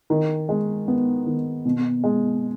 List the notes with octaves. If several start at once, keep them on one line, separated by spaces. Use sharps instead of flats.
D#3
G#3
B3
D#3
B2
G#3